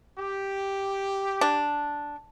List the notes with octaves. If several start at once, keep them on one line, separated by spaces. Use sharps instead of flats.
G4
D4